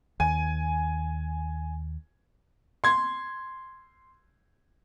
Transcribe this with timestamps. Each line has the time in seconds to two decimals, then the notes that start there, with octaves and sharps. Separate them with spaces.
0.20 D#2 G#5
2.84 C6 G#6